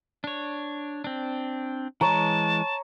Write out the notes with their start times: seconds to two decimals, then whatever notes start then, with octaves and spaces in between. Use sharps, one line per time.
0.24 D4 C#5
1.04 C4 D4
2.01 E3 G#3 C#5 A5 A#5